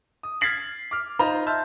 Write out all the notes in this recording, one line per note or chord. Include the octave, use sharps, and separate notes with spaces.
D#6
F6 G#6 A6 B6 C7 F#7
D6 F6
D#4 F4 C5 D#5 A#5 B5
E5 A5 C6 F6 G6